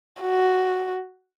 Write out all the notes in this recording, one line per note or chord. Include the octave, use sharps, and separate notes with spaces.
F#4